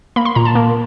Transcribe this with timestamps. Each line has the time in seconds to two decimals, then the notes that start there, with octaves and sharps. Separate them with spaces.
0.16 A#3 B5
0.25 C6
0.35 A#2 A#5
0.45 A5
0.55 A#3